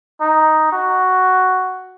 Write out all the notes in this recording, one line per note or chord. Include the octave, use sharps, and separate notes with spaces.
D#4
F#4